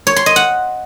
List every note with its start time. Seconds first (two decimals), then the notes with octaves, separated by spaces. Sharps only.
0.07 C#5
0.16 C6
0.26 D#5
0.36 F#5